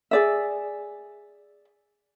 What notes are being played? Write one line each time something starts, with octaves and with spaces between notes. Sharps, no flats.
G#4 D5 E5